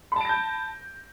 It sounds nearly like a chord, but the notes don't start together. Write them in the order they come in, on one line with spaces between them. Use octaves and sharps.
B5 A5 D7 A#6 G6